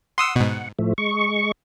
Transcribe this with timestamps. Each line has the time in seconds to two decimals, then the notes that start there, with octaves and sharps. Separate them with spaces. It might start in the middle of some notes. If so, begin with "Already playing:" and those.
0.18 F#5 C6 D#6 E6
0.36 G#2 B2
0.79 A2 F3 A3
0.98 G#3 C#6